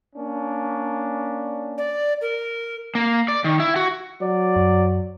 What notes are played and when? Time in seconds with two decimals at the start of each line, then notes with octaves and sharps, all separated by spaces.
0.16 A#3 C#4 D4
1.78 D5
2.21 A#4
2.95 A#3
3.28 D5
3.44 D#3
3.60 E4
3.76 F#4
4.21 F#3 D5
4.56 F#2